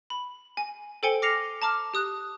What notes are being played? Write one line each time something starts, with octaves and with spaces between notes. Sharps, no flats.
B5
G#5
A4 C5 G5 G#5 C#7 G7
D6 F6 A#6 C7 C#7 F7
A5 A#5 D6 F6
G4 D#6 F#6